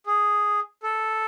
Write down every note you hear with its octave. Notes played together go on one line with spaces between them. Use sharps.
G#4
A4